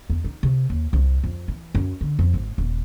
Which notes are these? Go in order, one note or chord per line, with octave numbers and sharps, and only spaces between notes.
E2
D#4
C3
D#2
C2
F2
E3
F#2
D3
F2
G#1
D#1